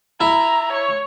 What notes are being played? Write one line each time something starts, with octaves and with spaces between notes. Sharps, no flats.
E4 A#5
C#5